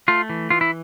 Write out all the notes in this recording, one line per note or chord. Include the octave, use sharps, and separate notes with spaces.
A3 F4
E3
E3 F4
E4